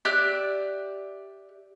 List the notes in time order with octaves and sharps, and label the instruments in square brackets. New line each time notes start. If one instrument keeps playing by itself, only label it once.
[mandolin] G4 D5 E5 F#6